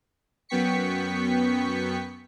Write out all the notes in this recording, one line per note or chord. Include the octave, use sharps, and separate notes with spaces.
F#2 B3 G5 C#6 B6 C#7